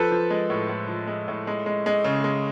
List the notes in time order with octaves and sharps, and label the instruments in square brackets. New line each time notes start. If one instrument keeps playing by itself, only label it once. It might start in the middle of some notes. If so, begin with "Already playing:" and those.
Already playing: [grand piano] F3 A4 B4
F3
G#3
A2
A2
F3
G#3
A2
G#3
G#3
G#3
C#3
G#3